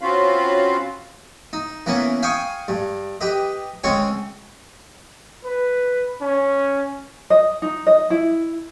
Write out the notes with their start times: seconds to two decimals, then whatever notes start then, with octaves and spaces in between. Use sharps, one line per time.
0.01 C4 C#4 F4 F#4 F5 B5
1.53 D#4
1.86 E3 A#3 B3 C#4
2.23 F5 G5 G#5 C#6 D#6
2.68 G2
3.21 G4 B4 D#5
3.84 C#2 C#3 G#3 C4 C#5 C#6
5.45 B4
6.22 C#4
7.30 D#5
7.62 D#4
7.87 D#5
8.10 E4